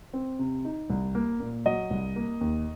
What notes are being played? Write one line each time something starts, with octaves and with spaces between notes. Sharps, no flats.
C4
C3
D#4
C2
A#3
A#2
F#3 D#5
C2
A#3
D#2